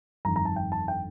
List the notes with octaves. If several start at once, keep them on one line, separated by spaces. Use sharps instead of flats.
G1 F2 D#3 A#5
A#5
A5
G5
A5
G5